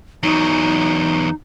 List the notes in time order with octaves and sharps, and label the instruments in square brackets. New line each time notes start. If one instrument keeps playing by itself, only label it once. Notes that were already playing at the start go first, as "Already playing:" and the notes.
[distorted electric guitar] E2 F#3 [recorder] D#4